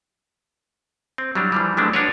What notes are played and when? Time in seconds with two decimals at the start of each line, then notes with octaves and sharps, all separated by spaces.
1.18 C4
1.35 F#3 G3 D4 E4
1.52 E3 F3 G3
1.77 F3 F#3 G#3 A3 B3 D4
1.93 D4 F4 F#4 A#4 B4 C#5